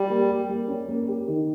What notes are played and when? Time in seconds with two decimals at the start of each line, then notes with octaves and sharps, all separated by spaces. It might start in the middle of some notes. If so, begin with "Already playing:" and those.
Already playing: G3
0.10 A#3
0.29 G4
0.49 A#3
0.68 C#4
0.88 A#3
1.08 G4
1.28 D#3